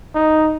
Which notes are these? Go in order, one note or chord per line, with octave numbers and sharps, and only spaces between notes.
D#4